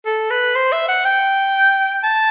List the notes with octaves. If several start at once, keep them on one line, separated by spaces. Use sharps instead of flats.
A4
B4
C5
E5
F#5
G5
A5